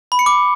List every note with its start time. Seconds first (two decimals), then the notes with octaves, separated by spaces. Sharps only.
0.12 B5
0.19 C#7
0.26 D6